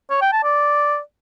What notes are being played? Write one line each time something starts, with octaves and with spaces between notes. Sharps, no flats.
C#5
G5
A5
D5